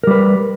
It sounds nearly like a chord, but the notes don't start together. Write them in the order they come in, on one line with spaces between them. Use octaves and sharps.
A#4 G3 B4